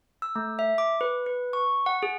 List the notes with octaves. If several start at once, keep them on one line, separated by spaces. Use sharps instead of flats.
E6
A3
E5
D6
B4
B4
C#6
F#5
G#4